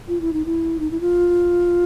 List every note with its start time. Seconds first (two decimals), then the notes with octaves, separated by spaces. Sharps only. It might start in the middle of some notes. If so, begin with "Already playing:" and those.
0.08 F4
0.21 E4
0.33 D#4
0.45 E4
0.80 D#4
0.91 E4
1.01 F4